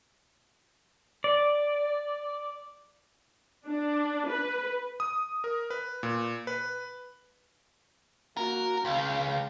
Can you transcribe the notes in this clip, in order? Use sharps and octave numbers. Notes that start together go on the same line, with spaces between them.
D5
D4
B4
D#6
A#4
B4
A#2
B4
A#3 F#4 A#4
C#2 F5 G5